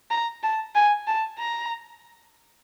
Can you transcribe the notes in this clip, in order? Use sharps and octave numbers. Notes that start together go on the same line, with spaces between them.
A#5
A5
G#5
A5
A#5